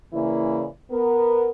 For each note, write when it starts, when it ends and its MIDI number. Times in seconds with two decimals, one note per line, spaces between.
0.13 0.65 49
0.13 0.65 52
0.13 0.65 58
0.13 0.65 64
0.13 0.65 74
0.91 1.51 59
0.91 1.51 70